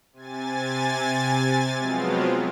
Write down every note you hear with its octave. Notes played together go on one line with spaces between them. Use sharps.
C3 G#5 A6
F3 F#3 G#3 B3 C4 F4